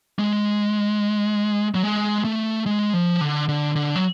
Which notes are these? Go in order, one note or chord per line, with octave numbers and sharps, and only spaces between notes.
G#3
F#3
G#3
A3
G#3
F3
D3
D3
D3
F#3